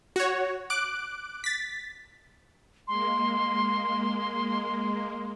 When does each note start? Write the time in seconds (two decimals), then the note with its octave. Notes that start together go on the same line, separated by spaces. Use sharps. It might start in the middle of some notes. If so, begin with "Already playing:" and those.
0.16 F#4 C#5
0.70 D6 F#6 D7
1.44 A6 B6
2.88 G#3 A#3 C6